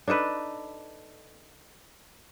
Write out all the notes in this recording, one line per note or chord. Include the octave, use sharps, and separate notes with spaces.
D4 D#4 A4 B4